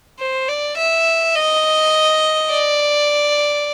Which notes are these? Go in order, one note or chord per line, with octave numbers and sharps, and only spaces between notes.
C5
D5
E5
D#5
D5